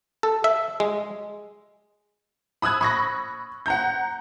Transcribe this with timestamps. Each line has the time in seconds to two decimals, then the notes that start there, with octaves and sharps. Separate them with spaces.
0.23 A4
0.44 E5
0.80 G#3
2.62 B5 D#6 E6 F#6 G#6
2.81 B5 C#6 A#6
3.66 F#5 A#5 G6